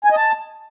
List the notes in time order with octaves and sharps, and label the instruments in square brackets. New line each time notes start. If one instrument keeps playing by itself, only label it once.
[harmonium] G#5
D#5
A5